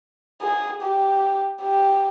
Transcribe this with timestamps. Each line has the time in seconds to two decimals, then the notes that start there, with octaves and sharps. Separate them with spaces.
0.42 G#4
0.82 G4
1.62 G4